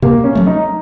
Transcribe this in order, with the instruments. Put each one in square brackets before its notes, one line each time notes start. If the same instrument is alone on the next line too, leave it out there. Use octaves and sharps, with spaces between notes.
[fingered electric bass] C3 [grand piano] A#3
[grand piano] C#4
[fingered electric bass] F#3 A3
[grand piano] D#4